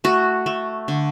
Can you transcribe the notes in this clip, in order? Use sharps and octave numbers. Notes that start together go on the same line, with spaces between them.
A3 F#4
A3
D3